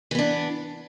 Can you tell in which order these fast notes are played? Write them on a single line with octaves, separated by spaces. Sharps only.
E3 B3 D4